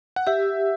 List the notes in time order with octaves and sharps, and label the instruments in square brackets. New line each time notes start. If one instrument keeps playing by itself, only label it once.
[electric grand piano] F#5
[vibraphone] G4 [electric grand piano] E5